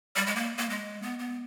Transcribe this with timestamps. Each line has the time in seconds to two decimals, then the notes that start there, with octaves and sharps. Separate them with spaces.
0.16 G3
0.26 G#3
0.36 A#3
0.58 A#3
0.69 G#3
1.02 B3
1.19 B3